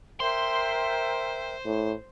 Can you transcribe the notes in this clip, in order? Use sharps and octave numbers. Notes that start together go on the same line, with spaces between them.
A#4 C5 E5 G5 C6
A2